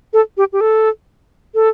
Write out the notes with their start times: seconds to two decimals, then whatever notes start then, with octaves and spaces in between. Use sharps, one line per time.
0.13 A4
0.37 G4
0.53 G4
0.61 A4
1.55 A4